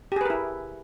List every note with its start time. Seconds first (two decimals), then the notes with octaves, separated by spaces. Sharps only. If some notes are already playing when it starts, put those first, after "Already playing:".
0.12 G4
0.16 G#4
0.21 B4
0.25 A#4
0.30 E4